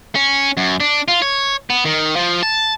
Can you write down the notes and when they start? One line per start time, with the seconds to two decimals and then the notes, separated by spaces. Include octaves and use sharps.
0.15 C#4
0.57 F#2
0.80 D4
1.08 F4
1.22 C#5
1.70 B3
1.85 D#3
2.16 F3
2.43 A5